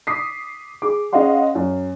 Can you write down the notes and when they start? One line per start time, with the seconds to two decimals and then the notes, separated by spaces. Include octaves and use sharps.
0.07 D6 D#6 B6 C7
0.82 G#4 D6
1.13 C#4 G#4 D#5 F5 F#5 C6
1.55 F#2